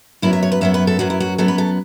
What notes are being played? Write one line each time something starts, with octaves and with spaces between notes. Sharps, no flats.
F#2 F#3 B3 E4
E5
C#5
B4
F#2 F#3 B3 E5
B4
A4
F#2 F#3 B3 F#4
E4
F#4
F#2 F#3 B3 A4
B4
A4